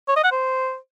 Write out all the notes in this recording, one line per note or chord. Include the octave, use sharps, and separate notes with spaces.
C#5
D#5
F#5
C5